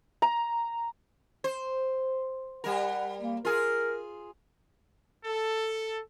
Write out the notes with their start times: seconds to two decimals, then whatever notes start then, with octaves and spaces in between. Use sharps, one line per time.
0.22 A#5
1.44 C5
2.64 G3 A#4 F#5
3.20 A#3
3.45 F4 G#4 A#4
5.25 A4